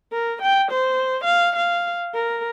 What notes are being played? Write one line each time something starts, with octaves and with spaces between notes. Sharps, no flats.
A#4
G5
C5
F5
F5
A#4